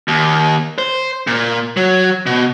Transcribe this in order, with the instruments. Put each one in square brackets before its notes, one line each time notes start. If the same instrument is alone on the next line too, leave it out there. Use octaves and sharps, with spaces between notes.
[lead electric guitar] D#2
C5
A#2
F#3
B2